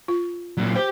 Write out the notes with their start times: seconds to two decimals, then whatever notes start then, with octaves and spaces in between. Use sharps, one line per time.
0.08 F4
0.58 A#2 F#3
0.75 G4 C5